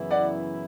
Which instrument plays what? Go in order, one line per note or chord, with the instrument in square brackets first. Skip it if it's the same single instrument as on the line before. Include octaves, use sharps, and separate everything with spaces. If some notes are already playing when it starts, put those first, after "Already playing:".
Already playing: [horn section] F#2 C#3 E3 B3 E4
[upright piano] D5 F#5